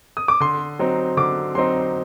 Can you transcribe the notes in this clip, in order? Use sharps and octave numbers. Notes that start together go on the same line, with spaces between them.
D#6
D6
D3 C6
F#3 C4 D#4
D3 D6
F#3 C4 D#4 C6